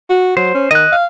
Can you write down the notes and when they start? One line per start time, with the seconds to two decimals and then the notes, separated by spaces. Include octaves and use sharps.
0.10 F#4
0.37 F#3 C5
0.54 C#4
0.71 D#3 D#5 F#6
0.92 F5